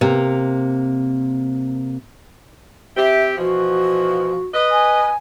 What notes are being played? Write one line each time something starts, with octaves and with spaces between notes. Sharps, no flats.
C3 A#3
C4 G4 E5
B2 E3 F3 F#4
B4 D#5
G#5